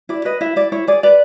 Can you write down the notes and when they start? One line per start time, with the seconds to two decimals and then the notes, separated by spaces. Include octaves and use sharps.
0.09 E4 D5
0.25 B4 D#5
0.41 E4 E5
0.56 E4 D5
0.72 E4 C#5
0.87 G#4 D5
1.03 B4 D5